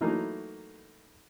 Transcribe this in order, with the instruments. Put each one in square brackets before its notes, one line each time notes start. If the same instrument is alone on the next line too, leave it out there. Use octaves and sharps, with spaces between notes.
[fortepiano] E3 F#3 A3 A#3 D#4 E4